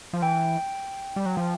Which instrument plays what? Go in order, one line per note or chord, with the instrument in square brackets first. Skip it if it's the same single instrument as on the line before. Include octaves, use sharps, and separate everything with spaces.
[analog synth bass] F3
[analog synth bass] E3 [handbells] G5
[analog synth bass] G3
F#3
F3